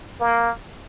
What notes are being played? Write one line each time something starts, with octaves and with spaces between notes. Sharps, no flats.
A#3